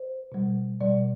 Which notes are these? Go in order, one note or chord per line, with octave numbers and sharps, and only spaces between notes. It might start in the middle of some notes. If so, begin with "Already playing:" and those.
Already playing: C5
B2 G3
B2 G3 D5